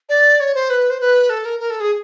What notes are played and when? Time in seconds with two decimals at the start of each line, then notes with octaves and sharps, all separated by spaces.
0.09 D5
0.40 C#5
0.54 C5
0.70 B4
0.90 C5
1.00 B4
1.30 A4
1.45 A#4
1.60 A#4
1.70 A4
1.80 G#4